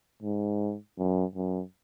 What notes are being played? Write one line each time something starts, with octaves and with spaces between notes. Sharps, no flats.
G#2
F#2
F#2